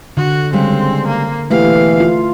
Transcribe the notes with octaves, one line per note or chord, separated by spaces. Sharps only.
D3 F#4
C#3 G3 G#3 C4
A#3
B2 E3 A3 A#3 G4 F5
F4